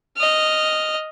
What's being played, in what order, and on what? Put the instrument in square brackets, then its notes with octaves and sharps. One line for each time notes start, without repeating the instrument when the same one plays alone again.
[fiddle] D#5 F6